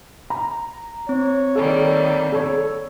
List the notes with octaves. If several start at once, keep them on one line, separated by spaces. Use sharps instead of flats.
A#5
C4 C#5
D#3 G3 A#3 A4
A4 C#5